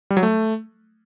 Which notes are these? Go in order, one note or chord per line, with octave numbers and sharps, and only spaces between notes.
G3
F#3
A3